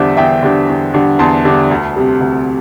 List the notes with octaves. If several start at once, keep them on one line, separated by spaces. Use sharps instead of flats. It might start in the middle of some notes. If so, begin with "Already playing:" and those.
Already playing: E2 D3 G3 D4 C5 E5
E2 E5 G5
D3 G3 D4
E2
D3 G3 D4
E2 A5 C6
D3 G3 D4
D2
C3 G3
D2